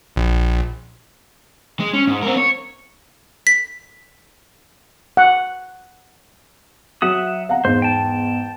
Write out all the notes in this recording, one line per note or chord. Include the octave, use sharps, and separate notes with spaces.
A#1
G#3
C#4
G#2
C4 A#4
C#5
B6
F#5
F#3 E5 F#5 D#6
F5 F#5 A#5
E2 G#2 C5
G5 A5